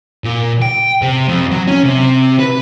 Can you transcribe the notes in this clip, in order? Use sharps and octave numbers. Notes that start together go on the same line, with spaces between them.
A#2
G5
C3
F2
F#3
C#4
C3
B4